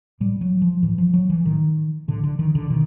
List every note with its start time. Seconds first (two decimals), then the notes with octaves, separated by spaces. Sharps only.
0.20 A2 G3
0.41 F#3
0.62 F3
0.83 A2 E3
0.98 F3
1.14 F#3
1.30 E3
1.45 A2 D#3
2.08 A2 D3
2.23 D3
2.39 D#3
2.55 D3
2.70 B2 D#3